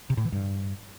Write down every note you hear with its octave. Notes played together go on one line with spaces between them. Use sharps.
C3
A2
E3
G2